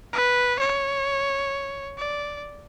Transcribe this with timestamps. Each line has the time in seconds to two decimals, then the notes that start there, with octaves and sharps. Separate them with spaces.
0.13 B4
0.59 C#5
1.98 D5